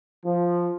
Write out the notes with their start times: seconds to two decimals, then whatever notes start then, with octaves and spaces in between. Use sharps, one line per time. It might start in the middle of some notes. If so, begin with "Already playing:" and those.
0.24 F3